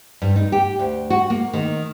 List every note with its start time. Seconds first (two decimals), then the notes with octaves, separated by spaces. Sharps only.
0.22 G2
0.36 D#4
0.52 G4
0.79 D2
1.10 F#4
1.30 A#3
1.53 D#3